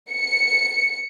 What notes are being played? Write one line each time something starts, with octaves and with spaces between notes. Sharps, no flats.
C#7